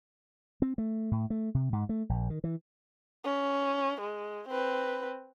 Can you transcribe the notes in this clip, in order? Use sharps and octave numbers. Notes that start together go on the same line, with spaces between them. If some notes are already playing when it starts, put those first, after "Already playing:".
C4
A3
A2
A3
C3
G#2
A3
A#1
D#3
E3
C#4
G#3
C4 B4